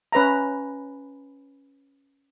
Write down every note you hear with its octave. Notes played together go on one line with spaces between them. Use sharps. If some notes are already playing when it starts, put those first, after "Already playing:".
C#4 B4 E5 A#5